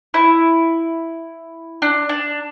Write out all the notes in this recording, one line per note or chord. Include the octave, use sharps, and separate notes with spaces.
E4
D4
D4